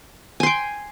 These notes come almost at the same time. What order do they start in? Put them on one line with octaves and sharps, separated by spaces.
G#5 C6 G5